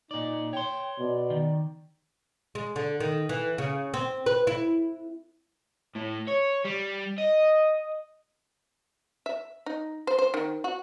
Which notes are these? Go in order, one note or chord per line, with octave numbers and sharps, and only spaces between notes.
A#2 D#4 D5
C#5 G5 C6
B2 D5
D#3
G#3
D3
D#3
E3
C#3
C4
B4
E4
A2
C#5
G3
D#5
E5
D#4
C5
C5
D#3
F#4